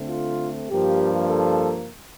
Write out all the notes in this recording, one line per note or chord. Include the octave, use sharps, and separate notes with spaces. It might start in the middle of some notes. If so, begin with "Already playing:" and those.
Already playing: D3 A3 C4
F4
G2 F3 A#3 G4
A4